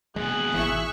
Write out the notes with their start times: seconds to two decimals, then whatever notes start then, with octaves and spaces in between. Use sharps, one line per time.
0.16 D#2 B2 G#3 G#4 F#6
0.54 G#1 E3 E5 C#6